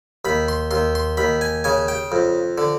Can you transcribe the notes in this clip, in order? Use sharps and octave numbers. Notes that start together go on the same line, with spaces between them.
D#2 B5
C6
D#2 C6
C6
D#2 B5
G#5
C#3 G#5
G5
F2
D3